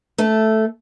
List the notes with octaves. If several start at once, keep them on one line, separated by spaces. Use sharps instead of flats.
A3 A4